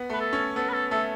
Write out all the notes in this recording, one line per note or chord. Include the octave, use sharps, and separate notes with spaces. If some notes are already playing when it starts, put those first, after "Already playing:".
Already playing: B3
A3 B4
A4
C#4
B3 A4
B4
A4
A3 A4